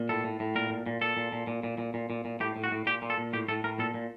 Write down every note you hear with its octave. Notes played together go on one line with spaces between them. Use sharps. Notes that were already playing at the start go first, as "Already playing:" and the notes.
Already playing: A#2
A2 A4
A2
A2
A#2 A#4
A#2
A#2
A#2 A4
A#2
A#2
A#2
A#2
A#2
A#2
A#2
A#2
A2 G4
A2
F#4
A2
A#2 G4
A#2
A4
A#2
A2 G4
A2 A4
A2 A#4
A#2 A4
A#2